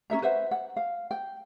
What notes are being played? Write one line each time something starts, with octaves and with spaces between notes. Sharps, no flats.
C#4 A4 E5 A#5
B4 C5 E5 F#5
F#5
F5
G5